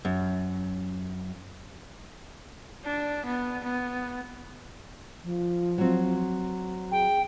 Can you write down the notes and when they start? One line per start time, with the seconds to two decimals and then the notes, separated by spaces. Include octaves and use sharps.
0.05 F#2
2.85 D4
3.26 B3
3.64 B3
5.24 F3
5.78 F#3 C4
6.92 G#4 G5